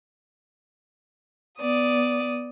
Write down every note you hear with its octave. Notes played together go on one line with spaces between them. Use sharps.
B3 D5 D#6